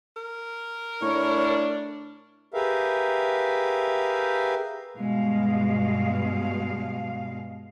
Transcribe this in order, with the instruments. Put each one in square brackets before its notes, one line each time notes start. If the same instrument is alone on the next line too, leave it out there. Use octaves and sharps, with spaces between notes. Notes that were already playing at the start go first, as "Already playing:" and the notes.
[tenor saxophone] A#4
[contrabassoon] A2 [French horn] D4 [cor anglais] C#5
[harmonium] G4 G#4 A#4 B4 E5 F5
[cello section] G2 B2 G#3 F5